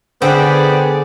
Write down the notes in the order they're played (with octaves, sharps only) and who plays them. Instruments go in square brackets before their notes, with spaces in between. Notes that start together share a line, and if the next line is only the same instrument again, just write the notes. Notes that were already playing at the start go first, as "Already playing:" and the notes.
[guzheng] D3 [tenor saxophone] B3 [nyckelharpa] G#4 D5 [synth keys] C5 G5 B6